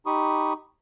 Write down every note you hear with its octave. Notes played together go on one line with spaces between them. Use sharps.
D#4 G4 B5 C#6 D#6